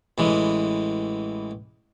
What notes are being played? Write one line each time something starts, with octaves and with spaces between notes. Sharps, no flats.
A1 E3 G#3